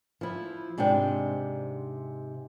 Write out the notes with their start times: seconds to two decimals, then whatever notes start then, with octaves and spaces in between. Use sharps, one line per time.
0.21 F3 E4
0.78 G#2 C3 D4 G5